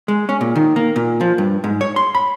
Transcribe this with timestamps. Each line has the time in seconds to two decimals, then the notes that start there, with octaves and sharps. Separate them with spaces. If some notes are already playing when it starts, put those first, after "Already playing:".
0.08 G#3
0.29 C#4
0.41 A#2
0.56 D#3
0.76 A#3
0.96 A#2
1.21 F3
1.38 G2
1.64 G#2
1.81 C#5
1.96 C6
2.15 B5